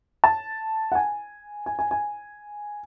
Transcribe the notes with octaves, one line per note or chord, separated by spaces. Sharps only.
A5
F#5
G#5
G#5
G#5
G#5